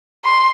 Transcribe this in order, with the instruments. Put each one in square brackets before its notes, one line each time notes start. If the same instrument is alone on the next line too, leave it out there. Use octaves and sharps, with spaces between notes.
[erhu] C6